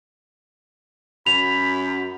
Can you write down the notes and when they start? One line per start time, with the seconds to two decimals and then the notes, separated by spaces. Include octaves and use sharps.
1.27 F#2 B5 F7